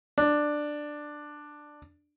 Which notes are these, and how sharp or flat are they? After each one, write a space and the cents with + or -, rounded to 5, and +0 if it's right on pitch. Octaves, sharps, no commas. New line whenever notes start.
D4 +10